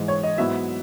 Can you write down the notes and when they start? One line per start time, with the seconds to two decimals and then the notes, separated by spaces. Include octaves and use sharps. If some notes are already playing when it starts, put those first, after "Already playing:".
Already playing: G#2 E3 G#3
0.08 C#5
0.23 D#5
0.38 G#2 F#3 B3 E4 E5